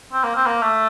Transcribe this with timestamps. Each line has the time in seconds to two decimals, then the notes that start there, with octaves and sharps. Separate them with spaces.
0.12 C4
0.24 A#3
0.35 C4
0.46 A#3
0.62 A3